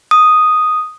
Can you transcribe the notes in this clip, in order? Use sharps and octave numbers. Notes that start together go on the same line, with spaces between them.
D#6